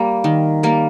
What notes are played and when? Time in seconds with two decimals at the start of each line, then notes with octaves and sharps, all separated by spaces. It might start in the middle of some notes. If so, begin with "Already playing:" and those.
Already playing: G3 A#3
0.24 D#3
0.63 G3 A#3